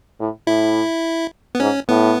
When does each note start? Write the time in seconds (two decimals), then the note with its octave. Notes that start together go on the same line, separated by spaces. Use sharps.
0.19 A2
0.47 A2 E4
1.55 B3
1.60 G#2 C#4
1.89 A2 B3